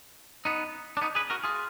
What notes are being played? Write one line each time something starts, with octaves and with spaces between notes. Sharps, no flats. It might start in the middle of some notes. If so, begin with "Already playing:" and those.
B3 D#4
D4
B3 D#4
G#4 B4
F#4 A#4
F4 G#4